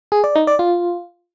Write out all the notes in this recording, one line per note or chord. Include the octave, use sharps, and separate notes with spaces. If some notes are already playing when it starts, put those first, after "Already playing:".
G#4
D5
D#4
D5
F4